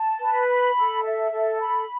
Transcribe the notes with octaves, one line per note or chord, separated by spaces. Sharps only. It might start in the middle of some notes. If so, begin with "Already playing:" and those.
Already playing: A5
B4
B5
A4
E5
A4
B5